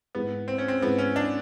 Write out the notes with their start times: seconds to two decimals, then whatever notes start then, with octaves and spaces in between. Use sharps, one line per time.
0.15 G#2 E3 G#3 B3
0.48 C4
0.58 C#4
0.68 C4
0.82 G#2 E3 G#3 B3
0.98 C#4
1.16 D4